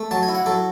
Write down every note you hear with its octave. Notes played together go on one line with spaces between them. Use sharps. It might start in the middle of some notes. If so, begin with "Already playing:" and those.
Already playing: A3
F#3 A5
G#5
E4
F#5
F#3 A4